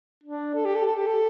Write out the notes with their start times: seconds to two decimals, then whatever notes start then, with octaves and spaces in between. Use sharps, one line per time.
0.24 D4
0.55 A4
0.65 G4
0.75 A4
0.86 A4
0.96 G4
1.07 A4